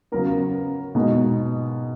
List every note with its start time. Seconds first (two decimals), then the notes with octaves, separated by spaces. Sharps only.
0.12 C#3 F#3 B3 A#4
0.95 B2 G#3 B3 D#4